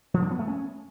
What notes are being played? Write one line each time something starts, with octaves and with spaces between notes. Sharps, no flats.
F3
D4
B3
A3
C#4